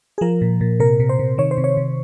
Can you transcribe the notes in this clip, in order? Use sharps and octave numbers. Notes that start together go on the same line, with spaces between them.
G#4
F3 A#4
A#2
A#2
C3 A#4
C3
C5
C3
D#3 C#5
C5
C3
C#5
C3